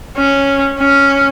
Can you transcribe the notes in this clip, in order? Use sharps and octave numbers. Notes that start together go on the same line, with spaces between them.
C#4
C#4